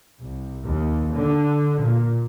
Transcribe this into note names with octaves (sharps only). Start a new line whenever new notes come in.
C2
D#2
D3
A#2